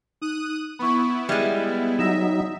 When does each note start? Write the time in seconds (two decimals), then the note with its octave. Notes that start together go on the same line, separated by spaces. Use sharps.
0.22 D#4 D#6 F#6 D#7
0.79 B3 E4 B5 C#6
1.29 G3 G#3 E5 G#6 D#7
1.99 F#3 D#4 E5 E6 A#6 E7